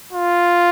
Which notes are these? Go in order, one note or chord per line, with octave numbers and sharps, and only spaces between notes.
F4